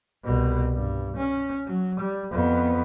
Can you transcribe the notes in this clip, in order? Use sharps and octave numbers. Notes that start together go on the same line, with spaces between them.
C2 B2
G2
C#4
F#3
G3
F2 B3